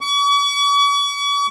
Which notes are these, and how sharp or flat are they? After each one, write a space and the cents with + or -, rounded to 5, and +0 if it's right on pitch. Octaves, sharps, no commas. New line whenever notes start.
C#6 +45